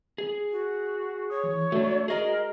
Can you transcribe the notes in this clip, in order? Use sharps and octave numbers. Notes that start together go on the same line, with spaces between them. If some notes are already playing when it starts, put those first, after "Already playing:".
G#4
F#4
C#5 D#6
E3
A3 D4 F#4
G#4 A#4 D#5